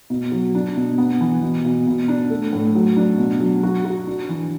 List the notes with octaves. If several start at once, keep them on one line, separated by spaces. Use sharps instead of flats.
B2
F#3
D4
B2
B3
E3
B2
B2
B2
D4
A3
A2
F#3
D4
B2
F#3
F#4
F#4
D4
E3